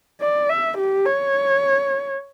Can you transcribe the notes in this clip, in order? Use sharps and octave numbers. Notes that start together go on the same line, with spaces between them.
D5
E5
G4
C#5